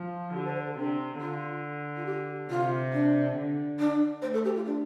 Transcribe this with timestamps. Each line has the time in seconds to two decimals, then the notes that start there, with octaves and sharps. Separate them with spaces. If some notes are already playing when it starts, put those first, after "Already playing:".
Already playing: F3
0.34 D3 G4
0.45 C5
0.55 C5
0.66 A4
0.76 C3 D4
1.20 D3 F4
1.96 F4
2.06 G4
2.50 C3 F4
2.92 D4
3.36 D3
3.79 D4
4.21 A3 C5
4.33 A4
4.44 G4
4.55 F4
4.65 D4